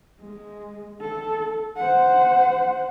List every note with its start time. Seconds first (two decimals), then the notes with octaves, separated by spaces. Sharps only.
0.21 G#3
1.01 A4
1.77 C5 F#5